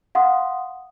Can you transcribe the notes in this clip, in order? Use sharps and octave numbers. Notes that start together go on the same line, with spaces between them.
F5 F#5 C6 D#6